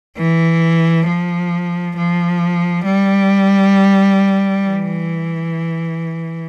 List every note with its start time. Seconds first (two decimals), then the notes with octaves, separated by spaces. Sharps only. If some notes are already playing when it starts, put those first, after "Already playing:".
0.18 E3
1.07 F3
1.96 F3
2.85 G3
4.64 E3